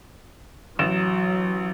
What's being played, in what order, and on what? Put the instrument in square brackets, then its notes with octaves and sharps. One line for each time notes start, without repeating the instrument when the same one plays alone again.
[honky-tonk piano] A1 E7 [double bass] F#3